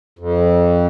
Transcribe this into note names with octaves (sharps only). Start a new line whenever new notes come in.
F2